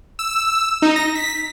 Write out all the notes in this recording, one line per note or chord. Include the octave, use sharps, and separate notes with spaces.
E6
D#4
A#6
B6